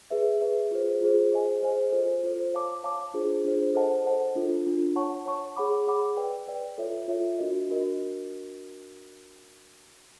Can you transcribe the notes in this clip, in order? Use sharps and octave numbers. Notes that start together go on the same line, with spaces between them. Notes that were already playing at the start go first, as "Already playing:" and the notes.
G#4 B4 E5
G#4 B4 E5
F4 G#4 C5
F4 G#4 C5
G#4 C5 D#5 G#5
G#4 C5 D#5 G#5
F4 A4 C5
F4 A4 C5
C#5 F5 A5 D6
C#5 F5 A5 D6
D4 F4 G#4 C5
D4 F4 G#4 C5
A4 C5 D#5 F#5 A5
A4 C5 D#5 F#5 A5
D4 F4 A4
D4 F4 A4
C#5 F#5 A5 C#6
C#5 F#5 A5 C#6
G#4 C#5 F#5 B5 D6
G#4 C#5 F#5 B5 D6
B4 D5 G5
B4 D5 G5
F4 A4 C#5 E5
F4 A4 C#5 E5
D4 F#4 A#4 D#5
D4 F#4 A#4 D#5